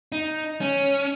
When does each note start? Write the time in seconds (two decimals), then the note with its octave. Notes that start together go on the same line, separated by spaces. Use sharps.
0.12 D#4
0.61 C#4